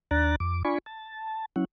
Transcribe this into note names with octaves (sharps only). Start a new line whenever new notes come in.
D#2 D4 D5 A#5 F#6 A6
F2 D6
D4 F4 D5 G#5 B5 C#6
A5
F#3 C#4 E4 F#5